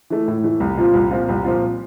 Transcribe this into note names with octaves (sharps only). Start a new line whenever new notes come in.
E3 A3
A2
E3 A3
C2
A#2 F3 C4 F4
C2
A#2 F3 C4 F4
C2
A#2 F3 C4 F4